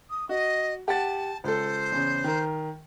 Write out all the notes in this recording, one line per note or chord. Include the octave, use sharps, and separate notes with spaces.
D#6
F#4 D#5
G4 F#5 A5 A6
C#2 A4 C5
E2 C#3
D#3 A#4